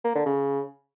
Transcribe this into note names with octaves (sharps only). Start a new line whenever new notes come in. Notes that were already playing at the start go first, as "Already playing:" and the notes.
A#3
D3
C#3